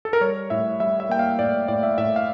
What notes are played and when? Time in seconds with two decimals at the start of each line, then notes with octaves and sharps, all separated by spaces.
0.05 A4
0.13 A#4
0.21 G3 C#5
0.50 A2 E5
0.80 G3 E5
1.00 E5
1.09 A#3 G5
1.19 F5
1.39 A2 D5
1.68 A2 D5
1.83 E5
1.98 A2 E5
2.16 F5